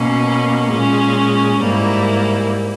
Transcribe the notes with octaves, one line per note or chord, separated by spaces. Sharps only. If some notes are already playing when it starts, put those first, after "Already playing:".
Already playing: B2 A#3 C#4
A#2 G#3 C#4
G#2 G3 A#3 E4